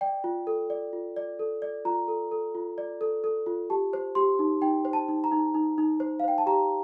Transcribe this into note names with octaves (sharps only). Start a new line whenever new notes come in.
D5 G5
F4
A4
D5
F4
D5
A4
D5
F4 A#5
A4
A4
F4
D5
A4
A4
F4
G4 A5
C5
G4 C6
D#4
D#4 G5
C5
A5
D#4
A#5
D#4
D#4
D#4
C5
F5
C5 G5
A5
G4 A#5